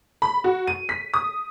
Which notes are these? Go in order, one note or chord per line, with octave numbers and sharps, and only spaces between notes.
B5
F#4
D#7
B6
D#6